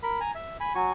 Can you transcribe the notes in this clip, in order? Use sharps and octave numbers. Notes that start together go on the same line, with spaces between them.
A#4 B5
G#5 A#5
E5
G#5 B5
F#3 F#4 G#5 C#6